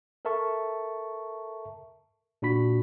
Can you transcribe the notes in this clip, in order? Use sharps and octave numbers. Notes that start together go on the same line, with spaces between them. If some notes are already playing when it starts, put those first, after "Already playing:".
A4 A#4 E5 A5 C#6
A#2 D4 F#4 B5 B6